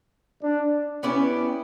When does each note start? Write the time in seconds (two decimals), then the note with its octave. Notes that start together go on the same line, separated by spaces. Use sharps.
0.40 D4
1.03 B3 C#4 E4 G4 D5